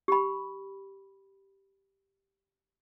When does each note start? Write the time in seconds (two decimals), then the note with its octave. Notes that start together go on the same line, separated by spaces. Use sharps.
0.08 G4 B5